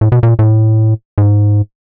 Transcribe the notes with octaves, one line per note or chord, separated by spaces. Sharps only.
A2
B2
A#2
A2
G#2